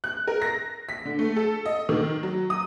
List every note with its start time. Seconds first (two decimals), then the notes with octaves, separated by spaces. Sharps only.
0.04 F#6
0.28 A#4
0.42 A#6
0.89 B6
1.05 D3
1.19 A3
1.36 A4
1.65 D#5
1.89 D#3
2.23 F#3
2.50 D#6